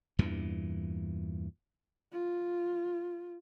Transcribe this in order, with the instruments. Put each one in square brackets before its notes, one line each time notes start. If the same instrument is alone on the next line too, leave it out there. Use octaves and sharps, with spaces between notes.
[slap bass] E2 G2 A#2 E3
[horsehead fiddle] F4